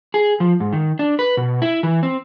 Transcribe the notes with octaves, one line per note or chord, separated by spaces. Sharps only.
G#4
F3
G#2
D#3
D4
B4
B2
E4
E3
C4